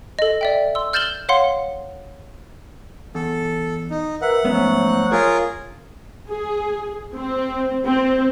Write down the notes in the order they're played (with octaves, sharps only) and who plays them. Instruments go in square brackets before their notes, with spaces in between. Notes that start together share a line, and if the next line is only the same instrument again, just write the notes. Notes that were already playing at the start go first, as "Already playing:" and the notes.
[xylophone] A4 D#5
D5 E5 G5
C6 E6
F6 G6 A6 E7 F#7 G7
C#5 F5 F#5 C6
[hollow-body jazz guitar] E2 [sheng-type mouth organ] A4
[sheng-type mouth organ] D#4
[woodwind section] A#4 B4 E5 [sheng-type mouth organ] F#5
[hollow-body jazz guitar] G#2 B3 C#4 [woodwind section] F3 F#3 A3
[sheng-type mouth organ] F4 G#4 A#4 [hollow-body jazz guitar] C#5
[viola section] G#4
C4
C4